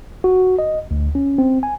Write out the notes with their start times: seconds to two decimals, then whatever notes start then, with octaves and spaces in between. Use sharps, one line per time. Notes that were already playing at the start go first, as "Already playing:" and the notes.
0.24 F#4
0.59 D#5
0.91 D2
1.15 C#4
1.38 C4
1.63 G#5